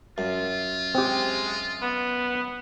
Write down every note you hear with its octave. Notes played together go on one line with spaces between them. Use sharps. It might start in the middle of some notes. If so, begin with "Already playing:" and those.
F#2 F4
G#3 C4 G4
B3